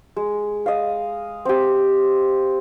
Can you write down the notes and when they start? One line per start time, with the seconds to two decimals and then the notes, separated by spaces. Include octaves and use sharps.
0.16 G#3
0.66 D#5 F5
1.45 C4 G4